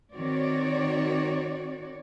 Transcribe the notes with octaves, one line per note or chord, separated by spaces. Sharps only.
D#3 C4 F#4 C#5 D5